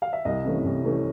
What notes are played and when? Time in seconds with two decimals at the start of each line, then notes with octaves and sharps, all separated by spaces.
0.02 F5
0.13 E5
0.25 C2 D#5
0.45 C3 E3 A3 C#4
0.64 C2
0.84 C3 E3 A3 C#4